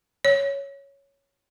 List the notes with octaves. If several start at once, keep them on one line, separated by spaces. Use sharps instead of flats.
C#5